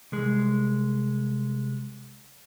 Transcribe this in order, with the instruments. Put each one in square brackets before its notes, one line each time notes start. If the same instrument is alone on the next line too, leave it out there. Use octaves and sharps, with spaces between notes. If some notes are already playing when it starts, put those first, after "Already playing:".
[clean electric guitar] C2 G#3